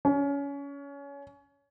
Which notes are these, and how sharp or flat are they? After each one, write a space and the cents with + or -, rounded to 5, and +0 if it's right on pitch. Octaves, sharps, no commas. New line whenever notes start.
C#4 +25